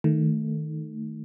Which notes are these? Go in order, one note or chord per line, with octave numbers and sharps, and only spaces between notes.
D#3 A3